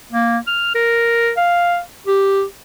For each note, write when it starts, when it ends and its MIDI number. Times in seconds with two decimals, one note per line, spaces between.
0.12 0.38 58
0.47 0.71 89
0.75 1.32 70
1.37 1.80 77
2.07 2.44 67